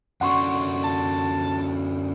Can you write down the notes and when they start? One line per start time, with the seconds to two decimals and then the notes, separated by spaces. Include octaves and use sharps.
0.21 F#2 D3 F#5 C6 C#6
0.84 A5